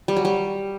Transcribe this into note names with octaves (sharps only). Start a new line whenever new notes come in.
G3
F#3
G3